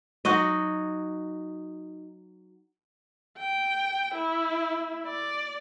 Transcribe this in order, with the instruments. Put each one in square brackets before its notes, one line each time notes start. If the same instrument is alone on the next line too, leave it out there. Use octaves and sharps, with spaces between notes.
[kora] F#3 D#4 F#4 D#5
[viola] G5
E4
D5